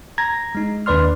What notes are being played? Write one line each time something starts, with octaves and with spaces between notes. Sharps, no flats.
A#5 G#6 A#6
G#3 D#4
D#2 D4 B4 D5 C6 F6